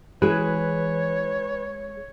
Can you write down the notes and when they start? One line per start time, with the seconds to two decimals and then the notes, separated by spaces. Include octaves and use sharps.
0.22 E3 G#3 G#4 B4 C#5